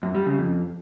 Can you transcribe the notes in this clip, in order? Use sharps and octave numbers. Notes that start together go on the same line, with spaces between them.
F#2
G3
C#3
F2